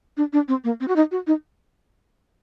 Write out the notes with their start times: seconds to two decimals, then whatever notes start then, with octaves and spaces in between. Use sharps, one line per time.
0.17 D4
0.33 D4
0.48 C4
0.64 A#3
0.80 C4
0.88 F#4
0.96 D#4
1.11 F#4
1.27 D#4